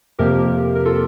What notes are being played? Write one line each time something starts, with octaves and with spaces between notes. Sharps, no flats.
F2 C3 F3 A#3 G4 A#4
A#4
F4 A4